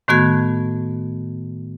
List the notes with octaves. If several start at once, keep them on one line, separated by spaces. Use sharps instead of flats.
A2 D#3 A3 B3 F#4 G#6